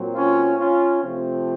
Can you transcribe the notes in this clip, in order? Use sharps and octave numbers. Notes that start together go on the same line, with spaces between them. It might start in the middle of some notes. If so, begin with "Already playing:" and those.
Already playing: A#2 F#3 C4
C#4 F4
C#4 F4
C3 F3 A3 C4